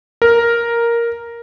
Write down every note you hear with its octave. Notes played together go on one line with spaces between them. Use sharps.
A#4